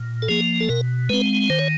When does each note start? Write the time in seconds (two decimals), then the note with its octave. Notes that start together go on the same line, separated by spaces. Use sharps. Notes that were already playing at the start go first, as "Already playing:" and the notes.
Already playing: A#2
0.22 A4
0.28 F3 A#3 G#4
0.60 A4
0.69 B2 A#4
1.09 G#3 C4 B4
1.50 D#3 C5
1.59 C#5